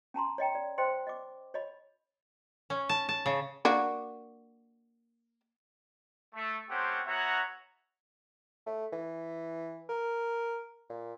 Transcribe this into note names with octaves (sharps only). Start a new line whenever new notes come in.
C#4 A5 A#5 C6
C#5 D#5 G5 A#5
D5
C5 D#5 G5 C6
D#5 D6
C#5 D#5 B5
C#4
A5
A5
C#3
A#3 D4 F#4
A3
A3 C4 C#4 G4 C5 F#5
B3 F#4 C#5 E5 F#5 A#5
A3
E3
A#4
A#2